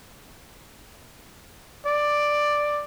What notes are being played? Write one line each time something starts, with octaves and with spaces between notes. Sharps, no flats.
D5